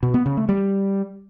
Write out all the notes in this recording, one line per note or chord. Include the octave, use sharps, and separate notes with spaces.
B2
B3
C#3
A3
G3